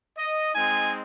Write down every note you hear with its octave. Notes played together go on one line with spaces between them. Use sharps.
D#5
G#3 C4 D#4 G#5